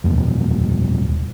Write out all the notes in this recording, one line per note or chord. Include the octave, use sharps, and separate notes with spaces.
D#1 G#1 F2